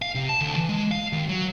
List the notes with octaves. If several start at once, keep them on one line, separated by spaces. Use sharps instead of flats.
F5
C3
A5
D2
E3
G#3
F5
D#2
F#3